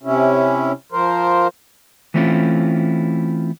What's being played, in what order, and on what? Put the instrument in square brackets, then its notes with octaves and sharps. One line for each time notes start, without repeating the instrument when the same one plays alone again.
[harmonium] C3 C#4 E4
F3 A#4 C5
[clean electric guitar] E3 A3 C4 C#4 E4 F4